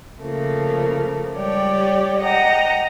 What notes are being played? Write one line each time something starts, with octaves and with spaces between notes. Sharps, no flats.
C#3 F3 A3 A#3
G3 G#3 G4 C#5 D5 G5
D#5 F#5 G5 A#5